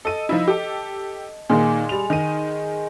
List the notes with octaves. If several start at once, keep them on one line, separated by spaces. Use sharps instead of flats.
A4 D#5 A5 D#7
F3 D#4 E4
G4 A4
A#2 D#3 G#3 A#3
G3 F7
D#3 D#5 D#7